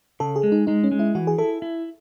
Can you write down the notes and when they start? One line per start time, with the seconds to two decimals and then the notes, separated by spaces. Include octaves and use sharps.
0.20 C#3 A4
0.36 G#4
0.43 G#3
0.52 D#4
0.67 G#3 D#4
0.83 C#4
0.91 G#3
0.99 E4
1.15 E3 F#4
1.27 G#4
1.38 E4 A4
1.62 E4